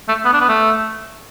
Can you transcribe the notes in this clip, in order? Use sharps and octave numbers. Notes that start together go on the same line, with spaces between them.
A3
B3
D4
B3
A3